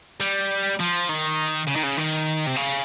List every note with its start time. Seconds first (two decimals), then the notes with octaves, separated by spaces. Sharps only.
0.20 G3
0.80 F3
1.09 D#3
1.68 C#3
1.76 D#3
1.83 C#3
1.98 D#3
2.47 C3
2.56 C#3